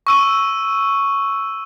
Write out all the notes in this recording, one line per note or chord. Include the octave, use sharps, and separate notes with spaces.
C#6 E6 D#7